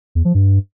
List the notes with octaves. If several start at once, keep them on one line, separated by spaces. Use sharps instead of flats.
E2
F3
G2